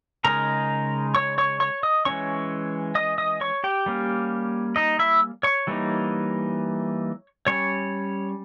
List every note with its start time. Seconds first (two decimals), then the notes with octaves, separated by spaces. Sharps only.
0.25 C#3 G#3 D#4 A#4 A#5
1.15 C#5 C#6
1.38 C#5 C#6
1.60 C#5 C#6
1.83 D#5 D#6
2.05 E3 G#3 C#4 C#5 C#6
2.95 D#5 D#6
3.18 D#5 D#6
3.41 C#5 C#6
3.64 G4 G5
3.86 G3 A#3 C#4
4.76 D#4 D#5
4.99 E4 E5
5.43 C#5 C#6
5.67 E3 G3 A#3 D#4
7.47 G3 C#4 C#5 C#6